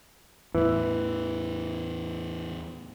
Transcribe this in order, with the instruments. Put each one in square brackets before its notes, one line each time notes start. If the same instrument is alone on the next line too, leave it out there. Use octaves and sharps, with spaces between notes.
[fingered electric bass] E2 A2 [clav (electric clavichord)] E3